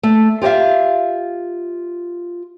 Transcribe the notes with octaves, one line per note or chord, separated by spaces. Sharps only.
A3
F4 G4 D5 E5 F5